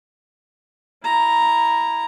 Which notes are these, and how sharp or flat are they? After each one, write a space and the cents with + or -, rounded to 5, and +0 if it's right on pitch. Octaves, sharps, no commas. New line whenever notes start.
E4 -5 A#5 +0